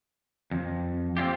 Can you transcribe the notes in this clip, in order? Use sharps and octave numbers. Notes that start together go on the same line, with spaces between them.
F2
C4 C#4 F4 G4